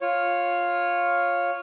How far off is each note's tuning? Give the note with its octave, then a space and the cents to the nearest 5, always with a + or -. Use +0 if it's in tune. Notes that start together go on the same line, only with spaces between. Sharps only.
F4 +5 C#5 -5